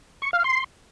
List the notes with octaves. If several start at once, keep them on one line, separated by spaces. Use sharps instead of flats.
C#6
F5
C6